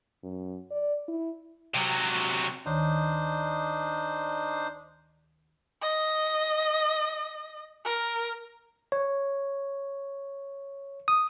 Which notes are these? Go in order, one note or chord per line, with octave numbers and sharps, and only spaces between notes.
F#2
D5
E4
C3 F#3
D2 D#3 D4 D#4 C5 C#5
D#5
A#4
C#5
D#6